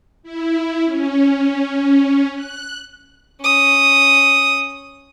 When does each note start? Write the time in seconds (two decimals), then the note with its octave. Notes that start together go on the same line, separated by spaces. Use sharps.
0.23 E4
0.85 C#4
2.34 F#6
3.42 C#4 D#6